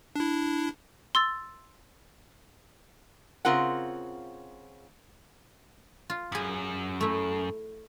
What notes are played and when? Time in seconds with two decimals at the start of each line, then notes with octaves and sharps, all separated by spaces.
0.16 D4 E4
1.15 C6 E6 A6
3.45 C#3 C4 F4 A#4 F#5
6.10 F4
6.32 F#2 G#4 B5
7.00 A3 E4